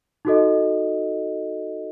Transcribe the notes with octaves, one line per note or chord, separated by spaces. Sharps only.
D#4 F#4 A4 D#5